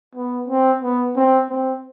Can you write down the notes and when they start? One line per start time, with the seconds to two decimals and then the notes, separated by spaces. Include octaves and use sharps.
0.15 B3
0.48 C4
0.82 B3
1.16 C4
1.50 C4